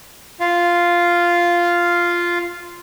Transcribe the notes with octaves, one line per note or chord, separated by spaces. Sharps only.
F4 F5